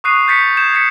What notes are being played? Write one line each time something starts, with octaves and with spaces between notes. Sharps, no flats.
C#6 D#6 F#6 C7 D#7
G6 A6 B6 C#7
G6 G#6 E7
A6 B6 C#7 E7